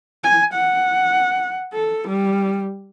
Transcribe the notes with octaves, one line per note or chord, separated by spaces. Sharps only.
G#5
F#5
A4
G3